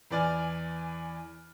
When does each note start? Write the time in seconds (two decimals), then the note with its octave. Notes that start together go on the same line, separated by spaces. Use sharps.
0.11 E2 E3 D5 G#5 F6 A6